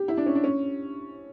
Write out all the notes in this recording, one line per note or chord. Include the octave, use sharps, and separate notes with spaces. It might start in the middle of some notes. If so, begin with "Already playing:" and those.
Already playing: G4
E4
D4
C#4
D4
C#4